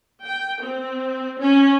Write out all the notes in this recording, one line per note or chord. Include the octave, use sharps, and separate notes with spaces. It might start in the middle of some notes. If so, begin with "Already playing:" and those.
G5
C4
C#4